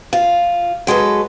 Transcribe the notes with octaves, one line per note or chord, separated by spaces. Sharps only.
F4
F#3 G#3 A4 B4